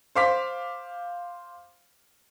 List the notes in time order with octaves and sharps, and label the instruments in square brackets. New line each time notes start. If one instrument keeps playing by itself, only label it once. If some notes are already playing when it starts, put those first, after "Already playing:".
[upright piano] C5 F5 D6 B6